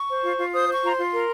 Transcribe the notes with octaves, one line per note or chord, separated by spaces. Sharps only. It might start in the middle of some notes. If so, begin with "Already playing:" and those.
Already playing: C#6
C5
F4
F4
C5 D#6
C5
C#6
F4 A#5
C6
F4
A#4